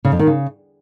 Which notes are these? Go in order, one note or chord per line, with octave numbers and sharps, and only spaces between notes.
C#3
F2
D#3
C#3